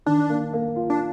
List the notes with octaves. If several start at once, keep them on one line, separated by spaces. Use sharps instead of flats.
D#3 D4
A#3
A#3
F4
D4